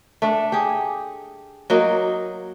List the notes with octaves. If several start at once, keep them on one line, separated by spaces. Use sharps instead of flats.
A3 D4
G4 G#4
F#3 A#3 D#4